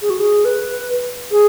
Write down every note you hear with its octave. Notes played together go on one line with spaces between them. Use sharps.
G#4
F#4
G#4
B4
G#4